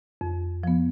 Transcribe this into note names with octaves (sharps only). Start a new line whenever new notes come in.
F2
F3 B3